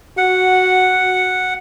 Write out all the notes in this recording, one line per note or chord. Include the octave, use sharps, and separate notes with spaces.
F#4 F#5